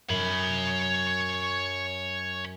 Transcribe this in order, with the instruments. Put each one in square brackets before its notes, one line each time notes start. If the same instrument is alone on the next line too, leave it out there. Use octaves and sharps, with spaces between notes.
[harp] F#2 [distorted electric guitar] C#5 B5